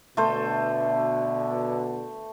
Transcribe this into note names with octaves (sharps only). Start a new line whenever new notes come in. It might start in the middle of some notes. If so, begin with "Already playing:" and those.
B2 D3 A3 C5